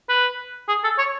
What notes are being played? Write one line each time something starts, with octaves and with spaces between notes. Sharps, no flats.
B4
G#4
A4
C#5